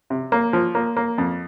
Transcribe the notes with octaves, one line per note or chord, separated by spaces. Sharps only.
C3
A#3
F3
A#3
A#3
F2